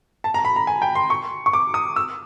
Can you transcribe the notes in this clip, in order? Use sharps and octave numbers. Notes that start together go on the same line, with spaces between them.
A5
A#5
B5
A#5
G#5
G5
C6
C#6
C#6
D6
D#6
E6